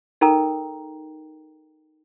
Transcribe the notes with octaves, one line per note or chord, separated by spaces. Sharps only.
D#4 A4 A#4 G5 A#5